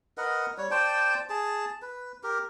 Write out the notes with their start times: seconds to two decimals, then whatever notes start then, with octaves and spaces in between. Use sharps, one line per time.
0.17 A#4 B4 D#5 F#5
0.58 G3 C#5
0.71 C5 D5 G5 A5
1.29 G#4 A5
1.82 B4
2.23 G4 A#4